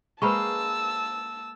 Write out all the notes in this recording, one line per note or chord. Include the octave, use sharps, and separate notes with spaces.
G#3 A#3 B4 C5 A5 B5 C#6 E6